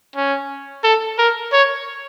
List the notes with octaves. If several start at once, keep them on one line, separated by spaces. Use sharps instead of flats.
C#4
A4
A#4
C#5